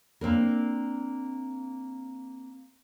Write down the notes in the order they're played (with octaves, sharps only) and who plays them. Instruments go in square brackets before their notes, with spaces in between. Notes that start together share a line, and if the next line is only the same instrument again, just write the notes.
[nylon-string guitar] A#3 C4 D4 A#4